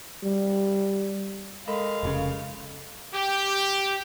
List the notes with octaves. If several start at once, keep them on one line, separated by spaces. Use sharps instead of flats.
G3
G#3 A4 A#4 F5 B5
F1 A#2 C#3
G4